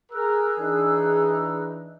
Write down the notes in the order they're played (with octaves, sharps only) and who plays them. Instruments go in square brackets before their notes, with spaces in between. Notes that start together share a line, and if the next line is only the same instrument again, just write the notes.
[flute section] G#4 E6 F#6 [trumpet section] A#4
[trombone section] E3 D4 [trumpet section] D#4